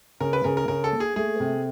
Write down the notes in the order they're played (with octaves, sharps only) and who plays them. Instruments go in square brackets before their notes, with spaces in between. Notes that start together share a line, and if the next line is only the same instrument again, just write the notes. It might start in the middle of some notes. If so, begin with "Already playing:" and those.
[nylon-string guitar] C#3 [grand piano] A#4
[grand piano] B4
[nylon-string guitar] C#3 [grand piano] A#4
[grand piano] A#4
[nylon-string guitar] C#3 [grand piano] A#4
[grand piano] A4
[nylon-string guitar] A#3
[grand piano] G#4
[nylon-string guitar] A3 [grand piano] G#4
[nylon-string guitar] C3